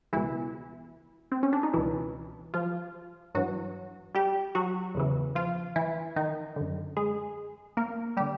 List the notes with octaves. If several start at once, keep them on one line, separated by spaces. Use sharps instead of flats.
C#2 B2 E3 E4
C4
C#4
D4
D#4
C#2 B2 E3 E4
F3 F4
G2 E3 F#3 F#4
G3 G4
F#3 F#4
E2 C#3 E3
F3 F4
E3 E4
D#3 D#4
F#2 D3
G#3 G#4
A#3 A#4
D3 G3 G4